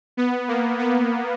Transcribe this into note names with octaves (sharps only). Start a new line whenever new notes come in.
B3
A#3
B3